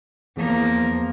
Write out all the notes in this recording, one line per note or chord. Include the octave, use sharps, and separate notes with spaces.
E2 F3 A#3